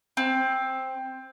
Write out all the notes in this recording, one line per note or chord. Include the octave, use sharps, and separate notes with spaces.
C4